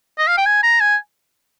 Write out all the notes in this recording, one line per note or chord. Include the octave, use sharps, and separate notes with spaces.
D#5
F5
G5
G#5
A#5
G#5